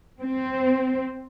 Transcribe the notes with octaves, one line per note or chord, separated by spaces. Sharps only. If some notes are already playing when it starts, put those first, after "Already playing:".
C4